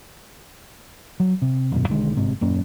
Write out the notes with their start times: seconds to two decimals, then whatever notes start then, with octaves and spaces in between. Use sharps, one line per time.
1.20 F#3
1.42 C3
1.72 D#1 F#2 B2
1.88 B1 D3 D#3 G#3
2.17 G1 G#2 C3
2.41 D#1 F#2 A#3 C#4